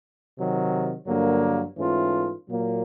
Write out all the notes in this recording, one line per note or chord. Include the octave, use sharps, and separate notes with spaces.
C3 D#3 F#3
G2 D3 F#3 A#3
G#2 E3 A3 C#4 F4
A#2 F#3 A#3